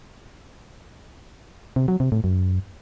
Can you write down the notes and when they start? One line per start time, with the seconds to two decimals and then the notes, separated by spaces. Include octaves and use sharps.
1.76 C3
1.88 F#3
2.00 C3
2.12 A2
2.24 F#2